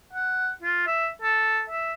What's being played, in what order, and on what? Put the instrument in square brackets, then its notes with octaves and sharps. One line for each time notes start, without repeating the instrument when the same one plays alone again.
[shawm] F#5
F4
E5
A4
E5